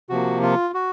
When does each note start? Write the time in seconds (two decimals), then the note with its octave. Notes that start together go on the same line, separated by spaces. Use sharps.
0.09 C3 F3 A#3 F#4
0.42 F4
0.74 F#4